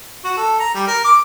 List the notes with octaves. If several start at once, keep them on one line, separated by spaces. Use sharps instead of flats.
F#4
A4
A#5
G3
A#4
D6